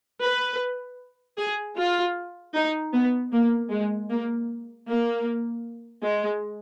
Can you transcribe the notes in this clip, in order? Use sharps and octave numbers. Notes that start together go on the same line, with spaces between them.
B4
G#4
F4
D#4
B3
A#3
G#3
A#3
A#3
G#3